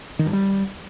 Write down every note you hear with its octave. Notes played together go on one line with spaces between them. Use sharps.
D#3
G2
G3